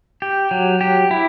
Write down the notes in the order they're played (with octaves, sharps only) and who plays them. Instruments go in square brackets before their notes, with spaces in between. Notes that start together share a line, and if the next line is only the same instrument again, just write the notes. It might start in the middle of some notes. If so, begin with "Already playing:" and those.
[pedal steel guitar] G4
F#3
G4
E4